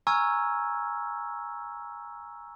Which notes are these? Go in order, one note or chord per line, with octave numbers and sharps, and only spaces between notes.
G#5 A#5 C#6 E6 F6 G#6